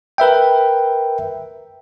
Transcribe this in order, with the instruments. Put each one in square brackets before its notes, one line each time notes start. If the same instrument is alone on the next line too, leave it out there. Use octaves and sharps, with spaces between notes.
[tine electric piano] A#4 B4 E5 G5